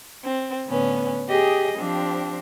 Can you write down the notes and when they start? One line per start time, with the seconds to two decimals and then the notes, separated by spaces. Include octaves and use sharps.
0.24 C4
0.67 A2 D3 B3 C#4 B4
1.30 G4 G#4 D#5
1.78 F3 C4 D4 G4